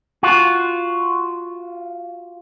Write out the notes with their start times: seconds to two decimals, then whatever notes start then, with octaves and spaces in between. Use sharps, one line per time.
0.23 F4 F#4